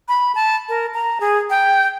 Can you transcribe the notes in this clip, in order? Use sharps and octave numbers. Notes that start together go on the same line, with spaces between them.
B5
A5
A#4
A#5
G#4
G5